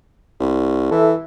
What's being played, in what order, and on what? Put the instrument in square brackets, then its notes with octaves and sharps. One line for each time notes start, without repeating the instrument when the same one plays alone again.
[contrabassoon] C2
[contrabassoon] E3 [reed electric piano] A4 E5